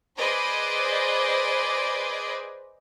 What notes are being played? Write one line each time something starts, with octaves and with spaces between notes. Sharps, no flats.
G#4 B4 C5 D5 D#5